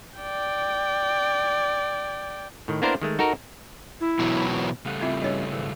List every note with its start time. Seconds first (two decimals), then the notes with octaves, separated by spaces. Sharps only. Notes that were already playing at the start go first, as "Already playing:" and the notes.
0.19 D5 G5
2.68 A2 D#3
2.82 A#3 B3 D4 E4 A#4 C5
3.02 D#3 G#3 A3
3.19 D#4 F#4 A4 A#4
4.01 E4
4.19 B2 E3 F#3
4.85 C#3 G3 A3 F5 F#5
5.01 C4 E4 F4 E5 G5
5.22 G2 E3 C#4 C#5 D#5
5.52 G#1 E3